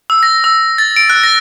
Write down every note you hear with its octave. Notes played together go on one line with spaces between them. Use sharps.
E6
A#6
E6
A6
D7
F#6
A#6